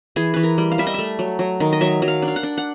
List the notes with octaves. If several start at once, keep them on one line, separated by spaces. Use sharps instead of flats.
E3 G#4
E3 B4
A#4
G3
F5
G3 E5
D#5
A3 E5
F#3
F#3
D#3
D#5
F#3 E5
F#3
F5
D4
F5
F#5
D4
F#5